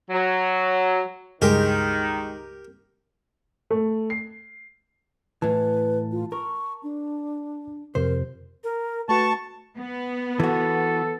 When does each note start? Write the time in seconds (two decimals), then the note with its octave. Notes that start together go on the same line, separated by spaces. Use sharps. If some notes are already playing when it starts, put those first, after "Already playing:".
0.10 F#3
1.42 C#2 G2 D#3 G#3 G4 A#4
3.70 A3
4.10 C7
5.42 A2 E3 B4 A5
6.12 F4
6.32 A#4 C#6
6.83 D4
7.95 F2 C3 A#4 C5
8.64 A#4
9.09 A3 F#4 B4 A5 C#6
9.78 B3
10.40 E3 F#4 A4